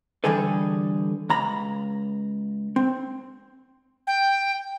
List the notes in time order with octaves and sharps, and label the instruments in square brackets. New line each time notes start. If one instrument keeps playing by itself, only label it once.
[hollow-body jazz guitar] D3 E3 G3 G#4 A4 B4
C#2 A#5 B5
C4
[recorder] G5